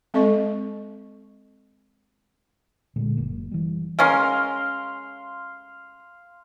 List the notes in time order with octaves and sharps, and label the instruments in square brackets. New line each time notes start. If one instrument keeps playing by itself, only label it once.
[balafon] G#3 C4 A4 D#5 C#6
[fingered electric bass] A#2 D3 G#3
F#1 A#3
E3 G3
[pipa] G#3 C#4 A#4 [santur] F5 C6